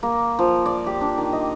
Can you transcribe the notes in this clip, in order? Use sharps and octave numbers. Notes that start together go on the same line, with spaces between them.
A#3
F3
D5
G4
D4
D#3
D#5